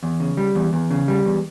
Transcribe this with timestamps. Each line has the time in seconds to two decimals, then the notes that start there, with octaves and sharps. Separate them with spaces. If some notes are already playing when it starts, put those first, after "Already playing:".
0.03 E2
0.20 C#3
0.37 G3
0.55 E2
0.73 E2
0.91 C#3
1.08 G3
1.25 E2